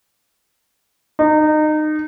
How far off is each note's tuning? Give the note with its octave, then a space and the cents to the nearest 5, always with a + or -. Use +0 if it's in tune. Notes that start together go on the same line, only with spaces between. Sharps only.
D#4 -25